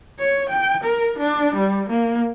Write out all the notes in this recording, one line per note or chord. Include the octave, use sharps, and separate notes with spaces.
C#5
G5
A#4
D4
G3
A#3